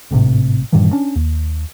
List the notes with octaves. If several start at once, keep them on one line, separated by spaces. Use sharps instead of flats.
G#1 A2 C3
G2 A#2 D#3 E3
C#4 D4
D#2